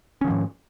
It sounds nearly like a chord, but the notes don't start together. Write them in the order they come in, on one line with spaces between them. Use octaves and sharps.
C#4 D#3 F3 G#2